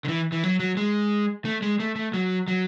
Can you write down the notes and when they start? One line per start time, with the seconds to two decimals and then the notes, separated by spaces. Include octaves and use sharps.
0.05 D3
0.08 E3
0.32 E3
0.43 F#3
0.60 F#3
0.77 G#3
1.45 A3
1.62 G#3
1.80 A3
1.96 A3
2.14 F#3
2.48 F#3